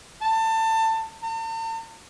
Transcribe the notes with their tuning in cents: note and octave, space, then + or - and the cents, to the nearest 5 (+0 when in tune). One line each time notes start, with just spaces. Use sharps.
A5 +25
A5 +45